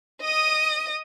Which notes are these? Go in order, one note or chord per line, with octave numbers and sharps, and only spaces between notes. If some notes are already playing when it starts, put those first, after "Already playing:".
D#5 D#6